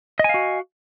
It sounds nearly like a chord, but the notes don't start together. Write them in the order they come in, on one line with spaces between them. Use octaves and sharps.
D#5 G#5 F5 F#4